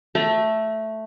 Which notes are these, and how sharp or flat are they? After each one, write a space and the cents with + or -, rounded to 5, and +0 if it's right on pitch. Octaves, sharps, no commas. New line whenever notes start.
A3 +0 A#5 +40